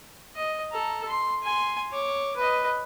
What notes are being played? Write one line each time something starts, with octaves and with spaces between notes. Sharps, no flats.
D#5
A4 A#5
C6
G#5 C6
C#5 D6
B4 D#5